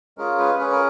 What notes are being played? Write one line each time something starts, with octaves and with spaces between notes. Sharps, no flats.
G#3 C#4 F4 G#4 A#4
B4
C#4 G#4 B4
A#4